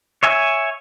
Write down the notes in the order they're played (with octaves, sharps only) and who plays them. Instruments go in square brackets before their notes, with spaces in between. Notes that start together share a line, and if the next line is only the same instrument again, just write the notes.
[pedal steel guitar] C#5 E5 G#5